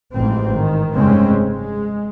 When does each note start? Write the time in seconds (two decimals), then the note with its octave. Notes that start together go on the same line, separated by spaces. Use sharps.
0.15 A1 G#2 F3 C4
0.57 D#3
0.94 F1 G2 C#3 G#3 C4 C#4
1.46 G#3